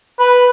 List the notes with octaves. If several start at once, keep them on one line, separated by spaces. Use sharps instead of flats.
B4